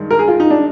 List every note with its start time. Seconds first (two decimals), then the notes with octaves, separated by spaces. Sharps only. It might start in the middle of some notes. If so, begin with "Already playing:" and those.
Already playing: G2 D#3 G#3
0.11 A#4
0.19 G#4
0.28 F4
0.40 D#4
0.50 D4